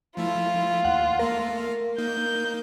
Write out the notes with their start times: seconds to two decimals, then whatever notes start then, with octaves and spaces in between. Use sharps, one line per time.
0.17 F3 A3 E4 F4
0.85 D#2 F#5
1.19 A3 A#3 A#4 F5
1.98 A#3 D#4 G6